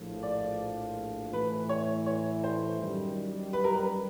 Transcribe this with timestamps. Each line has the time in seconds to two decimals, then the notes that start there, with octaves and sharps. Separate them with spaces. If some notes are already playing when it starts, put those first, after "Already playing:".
Already playing: A#1 A2 F3
0.23 D5
1.33 A2 E3 A3 B4
1.69 C#5
2.06 C#5
2.44 C5
2.80 F#2 D#3 G3
3.53 B4
3.64 A#4
3.73 B4